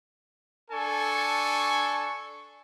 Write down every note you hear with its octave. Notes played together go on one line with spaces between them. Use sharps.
D4 A4 G#5 C#6